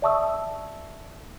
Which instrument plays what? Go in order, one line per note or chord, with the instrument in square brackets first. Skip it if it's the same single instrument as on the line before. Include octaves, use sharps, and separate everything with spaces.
[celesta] D5 E5 A5 C#6 D#6 E6